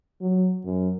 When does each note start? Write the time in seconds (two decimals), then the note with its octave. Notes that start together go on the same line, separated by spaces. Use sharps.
0.21 F#3
0.65 F#2